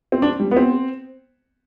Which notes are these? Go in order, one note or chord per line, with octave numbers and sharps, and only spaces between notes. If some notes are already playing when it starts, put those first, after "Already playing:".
C4
D4
G3
B3
C4